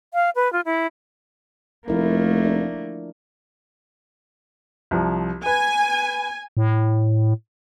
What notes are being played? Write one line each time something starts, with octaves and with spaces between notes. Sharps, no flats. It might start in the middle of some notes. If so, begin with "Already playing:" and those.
F5
B4
F4
E4
F1 F3 A3 A#3 E4 A#4
D4 D5
C2 F3
B4 G#5
A2